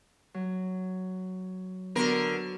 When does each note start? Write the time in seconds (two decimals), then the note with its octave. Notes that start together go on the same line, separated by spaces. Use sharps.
0.34 F#3
1.95 D3 B3 F#4 A#4